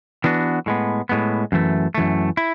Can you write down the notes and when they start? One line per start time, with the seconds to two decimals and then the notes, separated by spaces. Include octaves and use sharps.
0.24 E3 B3 D4 F#4
0.66 A2 G#3 B3
1.09 A2 G#3 B3
1.52 F#2 E3 A3
1.94 F#2 E3 A3
2.37 E4